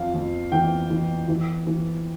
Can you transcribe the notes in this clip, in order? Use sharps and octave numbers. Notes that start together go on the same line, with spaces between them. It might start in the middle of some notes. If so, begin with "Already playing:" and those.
Already playing: F2 F5
F2
E3 G5
E3
E3
E3